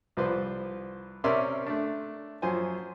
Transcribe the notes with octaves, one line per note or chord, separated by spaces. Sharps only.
C2 F3 B4 C5 D5
C3 C#4 A#4 D5 E5 C6
A3 D4
F#2 F3 C5 G#5